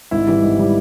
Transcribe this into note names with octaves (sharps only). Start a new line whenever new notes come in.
G#1 E4
G#2 E3 G3
G#1
E3 G3